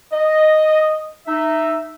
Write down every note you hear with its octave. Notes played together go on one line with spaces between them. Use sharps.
D#5
D#4 E5